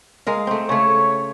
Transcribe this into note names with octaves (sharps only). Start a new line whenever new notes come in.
G#3 A#4 F5
A3 C4
C#3 A3 C#5